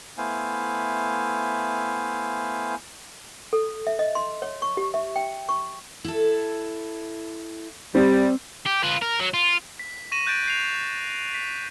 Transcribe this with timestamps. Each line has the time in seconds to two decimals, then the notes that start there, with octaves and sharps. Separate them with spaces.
0.18 A3 B3 E4 C5 F5 G#5
3.53 A4
3.87 E5
3.99 D#5
4.15 C6
4.42 C#5
4.62 C#6
4.77 G4
4.94 E5
5.16 G5
5.49 C#6
6.05 E4 A4
7.95 G3 C4
8.66 G4
8.83 F4 B4
9.02 A#4
9.20 F#3
9.34 F4
9.79 B6
10.12 C#6 A#6 D#7 E7 F#7
10.27 F#6 G6 A6 D7
10.46 G6 C7 F7
11.34 B6